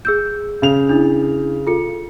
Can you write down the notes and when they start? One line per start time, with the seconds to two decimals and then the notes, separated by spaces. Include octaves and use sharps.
0.05 G#4 E6 G6
0.62 C#3 F7
0.89 D4 E4
1.67 F4 A4 C#7